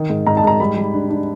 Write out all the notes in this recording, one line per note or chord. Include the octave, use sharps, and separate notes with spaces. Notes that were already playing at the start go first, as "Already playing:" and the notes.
Already playing: D#3
G#2
G#2 A#5
A5
G#2 A#5
G3 B5
G3
D4
D4